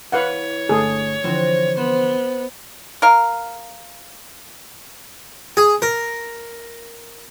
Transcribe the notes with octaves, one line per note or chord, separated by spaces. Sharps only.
E3 B4 C#5 F5 F#5
G1 D3 A3 G#4 A4
D3 E3 F3 C4 F#4
B3 C5
A#4 F5
G#4
A#4